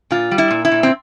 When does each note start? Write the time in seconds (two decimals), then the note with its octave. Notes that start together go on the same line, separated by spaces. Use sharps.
0.10 A#2 F4
0.31 G3
0.38 E4
0.51 A#2
0.65 E4
0.71 A#2
0.83 C4